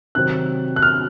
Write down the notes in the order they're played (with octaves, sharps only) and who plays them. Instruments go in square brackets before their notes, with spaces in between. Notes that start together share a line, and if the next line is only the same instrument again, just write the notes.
[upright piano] C3 D#3 F#3 C4 [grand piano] F#6
[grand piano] F#6
F6